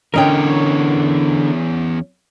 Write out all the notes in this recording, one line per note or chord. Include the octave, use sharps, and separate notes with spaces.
E2 D3 C#4 A#4 C#5 D#5 G5